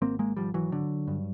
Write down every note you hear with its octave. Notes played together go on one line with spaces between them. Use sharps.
G#1 A#3 C4
G#3 A#3
G#1 F3 G3
E3 F#3
D3
G2